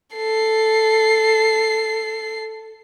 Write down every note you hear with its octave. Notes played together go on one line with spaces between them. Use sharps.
A4 C7